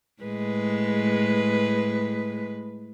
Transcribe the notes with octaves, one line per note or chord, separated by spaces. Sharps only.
A2 G#3 B4